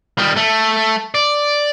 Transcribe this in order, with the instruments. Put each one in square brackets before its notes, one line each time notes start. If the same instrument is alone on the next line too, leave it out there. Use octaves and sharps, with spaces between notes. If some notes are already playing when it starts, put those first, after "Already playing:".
[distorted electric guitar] D#3 G3
A3
D5